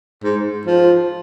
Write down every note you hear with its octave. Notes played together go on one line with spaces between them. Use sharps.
G#2
F3